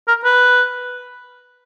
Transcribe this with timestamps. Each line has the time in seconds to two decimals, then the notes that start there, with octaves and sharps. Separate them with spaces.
0.08 A#4
0.25 B4